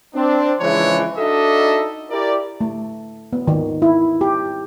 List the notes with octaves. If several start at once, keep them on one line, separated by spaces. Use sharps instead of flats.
C4 D4
C#3 E3 F3 G#3 D4 C#5
D4 D#4 F#4 A4 D#5 E5
E4 G4 A#4 D5
A3
B3
D#3
E4
G4